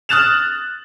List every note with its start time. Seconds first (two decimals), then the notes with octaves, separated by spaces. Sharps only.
0.09 D#6 F6 F#6 A6 E7 F7